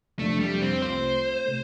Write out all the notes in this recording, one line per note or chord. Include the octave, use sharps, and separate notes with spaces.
F2 C3 F3 A3 D4
G3
C4
C2 C3 A3 F4 C5
C3 A3